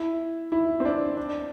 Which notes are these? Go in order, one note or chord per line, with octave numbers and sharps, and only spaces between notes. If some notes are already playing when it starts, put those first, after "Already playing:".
Already playing: E4
E4
C4
D4
D4